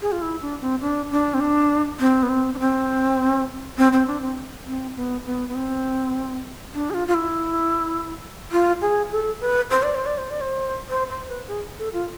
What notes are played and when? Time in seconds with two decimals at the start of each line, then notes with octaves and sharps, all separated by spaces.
0.01 G#4
0.12 F4
0.22 E4
0.42 D4
0.61 C4
0.81 D4
1.11 D4
1.34 C4
1.40 D4
2.00 C4
2.23 B3
2.29 C4
2.54 D4
2.59 C4
3.78 C4
3.93 C4
4.07 D4
4.22 C4
4.66 C4
4.96 B3
5.26 B3
5.48 B3
5.55 C4
6.75 D4
6.90 G#4
6.94 F4
7.08 F4
7.14 E4
8.52 F4
8.82 G#4
9.11 A4
9.40 B4
9.71 C5
9.83 D5
9.95 C5
10.06 D5
10.18 C5
10.30 D5
10.41 C5
10.89 C5
11.09 C5
11.28 B4
11.48 G#4
11.78 A4
11.93 F4